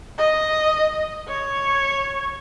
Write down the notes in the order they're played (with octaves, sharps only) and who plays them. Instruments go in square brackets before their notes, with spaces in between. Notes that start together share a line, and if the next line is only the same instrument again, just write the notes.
[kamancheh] D#5
C#5